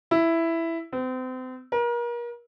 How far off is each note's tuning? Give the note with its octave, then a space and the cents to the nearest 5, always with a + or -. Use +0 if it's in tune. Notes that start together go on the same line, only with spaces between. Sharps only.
E4 +5
C4 -35
A#4 +35